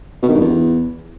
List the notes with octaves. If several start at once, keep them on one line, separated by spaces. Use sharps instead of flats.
B2
D#3
G2
E2